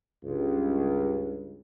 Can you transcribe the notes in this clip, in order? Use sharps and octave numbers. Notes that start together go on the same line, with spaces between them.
C#2 G2